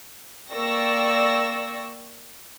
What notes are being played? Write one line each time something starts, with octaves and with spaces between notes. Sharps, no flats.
A#3 D5 G5 C#6 E6 A#6